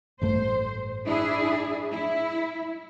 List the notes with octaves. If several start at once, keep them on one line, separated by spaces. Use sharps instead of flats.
A1 G2 A3 C5
D4 E4 G#4
E4